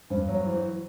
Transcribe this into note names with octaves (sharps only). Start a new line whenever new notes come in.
G2 C5
F#3 C#5
E3 C5